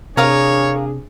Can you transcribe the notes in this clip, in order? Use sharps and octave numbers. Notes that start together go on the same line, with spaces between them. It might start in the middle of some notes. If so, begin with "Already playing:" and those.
C3 D4 G#4 A#4 C#5 F5 D#6